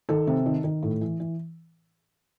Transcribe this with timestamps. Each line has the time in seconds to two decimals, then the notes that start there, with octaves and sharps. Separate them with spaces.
0.09 D#3 A4
0.27 C3
0.46 D#3
0.64 D#3
0.83 A2
1.01 E3
1.20 E3